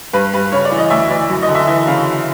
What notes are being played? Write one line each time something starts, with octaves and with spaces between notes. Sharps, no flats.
G2 B4
G2 B4
C#3 C#5
D5
E3
D#5
D2 E5
E3 D5
F#2
D#5
D3
E5
E3 E5
C#3 F5